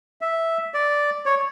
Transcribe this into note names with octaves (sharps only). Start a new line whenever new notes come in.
E5
D5
C#5